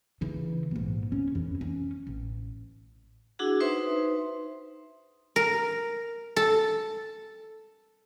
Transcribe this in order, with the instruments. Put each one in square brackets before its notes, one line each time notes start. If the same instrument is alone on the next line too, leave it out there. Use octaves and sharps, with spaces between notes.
[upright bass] C#3 E3
A#1 G#2
C#4
F2 E3
C#4
A1
[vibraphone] D4 E4 F#4 G#4 F#5
D#4 B4 C5 E5 C6
[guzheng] A#4
A4